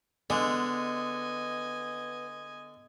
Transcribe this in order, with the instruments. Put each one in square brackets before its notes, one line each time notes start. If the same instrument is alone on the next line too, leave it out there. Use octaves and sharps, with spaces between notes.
[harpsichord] D3 [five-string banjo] G#3 [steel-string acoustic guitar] B3 [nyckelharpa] D#5 G#5